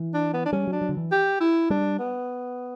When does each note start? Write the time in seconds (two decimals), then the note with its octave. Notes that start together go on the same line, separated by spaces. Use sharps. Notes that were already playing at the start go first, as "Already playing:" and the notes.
Already playing: E3
0.14 D4
0.33 B3
0.46 D4
0.53 G3 C#4
0.67 F#3 D4
0.81 F#3
0.89 D3
0.97 E3
1.12 G4
1.41 E4
1.70 G3 D4
1.99 B3